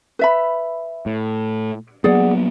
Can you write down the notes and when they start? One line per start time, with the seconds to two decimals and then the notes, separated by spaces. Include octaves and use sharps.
0.19 B4 E5 B5
1.06 A2
2.04 F#3 A#3 B3 G#4 D5 F#5